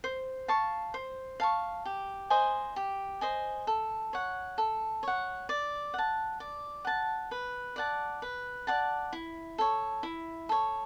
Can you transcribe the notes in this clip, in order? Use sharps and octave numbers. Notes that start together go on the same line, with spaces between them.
C5
F5 A5 C#6
C5
F5 A5 C#6
G4
C5 D#5 G#5
G4
C5 D#5 G#5
A4
C#5 F#5
A4
C#5 F#5
D5
F#5 A5
D5
F#5 A5
B4
D5 F#5 A5
B4
D5 F#5 A5
E4
A4 C#5
E4
A4 C#5